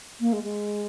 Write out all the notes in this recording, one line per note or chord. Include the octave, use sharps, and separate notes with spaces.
A#3
G#3
G#3